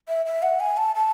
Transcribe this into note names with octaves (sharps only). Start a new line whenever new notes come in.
E5
E5
F#5
G#5
A5
A5